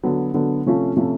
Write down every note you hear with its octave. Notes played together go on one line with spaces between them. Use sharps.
D3 F#3 B3
D3 F#3 B3
C3 F3 A3 C#4 F4
C3 F3 A3 C#4 F4